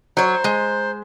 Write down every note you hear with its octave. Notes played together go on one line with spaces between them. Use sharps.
F#3 C5 C#5 A#5
G#3